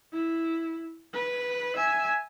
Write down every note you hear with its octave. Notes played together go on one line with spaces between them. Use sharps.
E4
B4
E5 G#5